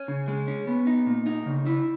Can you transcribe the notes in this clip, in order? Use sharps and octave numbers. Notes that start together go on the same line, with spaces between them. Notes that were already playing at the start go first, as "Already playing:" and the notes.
Already playing: C#4
C#3
G#3
C#4
B3
D#4
A#2
D#4
C#3
E4